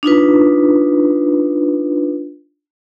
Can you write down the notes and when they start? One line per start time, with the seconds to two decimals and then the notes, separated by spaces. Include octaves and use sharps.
0.03 D4 D#4 F4 B4